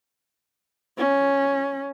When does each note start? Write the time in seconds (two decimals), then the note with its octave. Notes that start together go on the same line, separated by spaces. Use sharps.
0.98 C#4